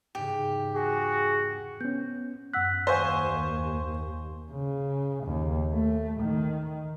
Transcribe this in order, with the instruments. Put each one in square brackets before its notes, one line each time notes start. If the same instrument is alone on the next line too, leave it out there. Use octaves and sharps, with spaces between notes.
[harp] E2 G#2 C#3 [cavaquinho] G4
[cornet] F#4 [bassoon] G#4
[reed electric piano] B3 C#4 [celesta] G6
[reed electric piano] F#2 F#6 [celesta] F#5 E6 B6
[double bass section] D#2 [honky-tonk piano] C5 G#5 [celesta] F5 C#6 G6
[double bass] C#3
D#2
A3
D#3